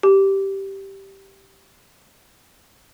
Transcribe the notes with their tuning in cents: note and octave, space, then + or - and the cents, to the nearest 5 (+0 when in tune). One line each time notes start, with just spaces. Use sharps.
G4 -5